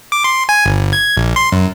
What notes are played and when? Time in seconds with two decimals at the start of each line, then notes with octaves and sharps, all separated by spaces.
0.12 D6
0.24 C6
0.49 G#5
0.66 G1
0.93 G#6
1.17 A#1
1.36 C6
1.52 F#2